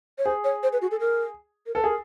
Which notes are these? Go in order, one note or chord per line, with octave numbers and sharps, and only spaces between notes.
C#5
G#4 C5
C#5
C5
B4
F#4
A4
A#4
A#4
A4 B4
G#4 A#4